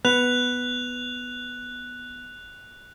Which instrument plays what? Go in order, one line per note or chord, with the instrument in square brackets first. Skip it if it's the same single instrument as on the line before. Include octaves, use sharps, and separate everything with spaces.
[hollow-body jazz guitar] B3 [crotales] F#6 F7